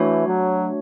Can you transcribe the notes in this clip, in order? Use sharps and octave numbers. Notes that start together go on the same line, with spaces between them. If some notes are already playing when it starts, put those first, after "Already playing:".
Already playing: E3 A3 D4 F#4 C#5
F#3